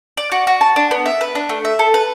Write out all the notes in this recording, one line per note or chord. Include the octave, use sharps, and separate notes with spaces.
D5
F#4
F#4
A5
D4
B3
E5
B4
D4
A3
E5
A4
B4